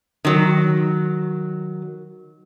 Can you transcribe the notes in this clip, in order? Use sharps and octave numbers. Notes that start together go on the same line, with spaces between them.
D#3 F#3